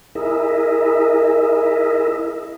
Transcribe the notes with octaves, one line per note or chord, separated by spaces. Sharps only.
E4 G#4 A#4 D#5 E5